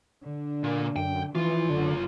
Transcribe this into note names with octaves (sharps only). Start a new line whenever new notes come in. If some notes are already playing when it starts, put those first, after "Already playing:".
D3 D4
A#2
F#2 G5
C#2 E3 F3 F4
F#1 D3